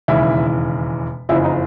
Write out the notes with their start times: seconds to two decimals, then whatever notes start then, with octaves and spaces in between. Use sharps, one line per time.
0.08 E1 D#2 C#3 E3 E4
1.29 F#1 F2 C#3 E3 E4
1.44 D#4